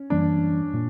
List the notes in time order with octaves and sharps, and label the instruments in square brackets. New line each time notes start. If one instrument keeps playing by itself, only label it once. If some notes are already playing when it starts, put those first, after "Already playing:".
Already playing: [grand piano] C#4
[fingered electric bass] F#2 E3 G3 A#3 [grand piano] D4
[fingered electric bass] A#2 A#3